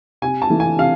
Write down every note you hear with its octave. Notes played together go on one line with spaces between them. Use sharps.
C3 G#5
A5
E3 A3 E4
G#5
C3 F5